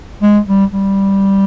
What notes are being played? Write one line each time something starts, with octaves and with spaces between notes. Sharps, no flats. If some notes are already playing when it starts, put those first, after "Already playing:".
G#3
G3
G3